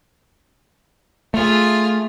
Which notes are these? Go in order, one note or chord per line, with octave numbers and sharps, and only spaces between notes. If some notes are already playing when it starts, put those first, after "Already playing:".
A3 F4 G#4